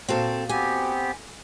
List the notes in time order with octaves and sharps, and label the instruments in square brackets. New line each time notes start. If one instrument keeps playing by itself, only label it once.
[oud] A#2 F#4 F5 [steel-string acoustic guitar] C4 A4
[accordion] B3 C4 G4 [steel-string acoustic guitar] G#5